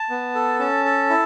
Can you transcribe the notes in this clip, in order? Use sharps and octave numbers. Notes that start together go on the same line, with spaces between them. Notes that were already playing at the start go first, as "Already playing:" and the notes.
Already playing: A5
B3
A4
C#4 A5
A4
E4